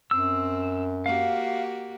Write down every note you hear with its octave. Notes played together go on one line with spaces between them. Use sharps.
F#2 C4 E6
A#3 F#4 G4 F5